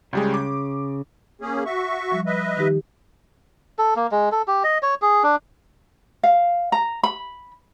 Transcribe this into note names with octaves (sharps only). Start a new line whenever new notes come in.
C#2 C#3 G3 G#3
D6
A#3 C#4 G#4
F#4 E5 C#6
F3 G3
B4 D#5 E5
D#3 D#4 G4
A4
A#3
G#3
A4
G4
D#5
C#5
G#4
D4
F5
A#5
B5